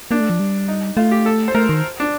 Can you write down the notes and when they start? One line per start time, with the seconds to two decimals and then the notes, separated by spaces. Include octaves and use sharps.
0.11 A#3 D4
0.20 A3
0.30 F3
0.40 G3
0.68 D#4
0.97 A3 F4
1.11 G4
1.26 A4
1.48 C5
1.55 A3 A#4
1.69 D#3
2.00 D4